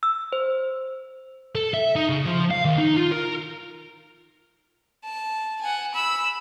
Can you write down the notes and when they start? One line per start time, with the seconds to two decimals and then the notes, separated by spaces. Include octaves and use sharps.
0.03 E6
0.33 C5
1.55 A4
1.74 E5
1.96 D#4
2.09 C#3
2.25 F3
2.50 F5
2.65 D#2
2.78 D#4
2.97 F4
3.11 A#4
5.05 A5
5.61 F#5 G#5
5.94 B5 E6